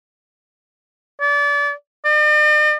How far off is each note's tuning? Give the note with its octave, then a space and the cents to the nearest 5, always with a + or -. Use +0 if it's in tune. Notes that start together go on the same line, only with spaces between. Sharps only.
D5 -30
D5 +45